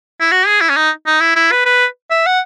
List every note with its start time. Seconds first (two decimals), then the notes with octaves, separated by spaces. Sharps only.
0.21 E4
0.32 F#4
0.47 G#4
0.61 E4
0.70 C#4
0.77 D#4
1.07 D#4
1.21 E4
1.36 E4
1.52 B4
1.66 B4
2.11 E5
2.27 F#5